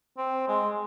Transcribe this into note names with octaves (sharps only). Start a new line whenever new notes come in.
C4
G#3